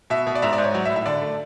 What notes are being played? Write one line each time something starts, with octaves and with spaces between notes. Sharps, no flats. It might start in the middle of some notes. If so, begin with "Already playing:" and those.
B2 E5
B2
D5
G#2 E5
D5
G#2
C#5
F#3 D5
E5
A2
E5
D3 D5
A3